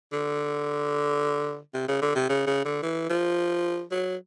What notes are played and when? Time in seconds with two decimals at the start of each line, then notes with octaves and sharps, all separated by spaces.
0.12 D3
1.74 C3
1.88 C#3
2.02 D3
2.15 C3
2.29 C#3
2.46 C#3
2.65 D3
2.82 E3
3.10 F3
3.91 F#3